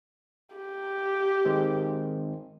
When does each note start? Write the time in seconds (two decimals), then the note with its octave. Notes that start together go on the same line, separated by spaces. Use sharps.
0.56 G4
1.45 D#3 G#3 C4